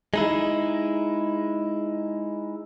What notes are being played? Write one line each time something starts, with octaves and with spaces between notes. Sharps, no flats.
G#3 D#4 E4